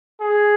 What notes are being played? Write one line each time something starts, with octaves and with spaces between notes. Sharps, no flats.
G#4